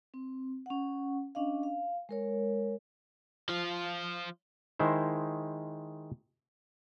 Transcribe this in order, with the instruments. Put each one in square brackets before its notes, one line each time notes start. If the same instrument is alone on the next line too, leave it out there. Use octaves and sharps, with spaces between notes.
[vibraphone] C4
C#4 F#5
C#4 D4 D#5 F5
F5
G#3 A#4 C#5
[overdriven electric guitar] F3 F4
[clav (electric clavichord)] D#3 G#3 E4 C5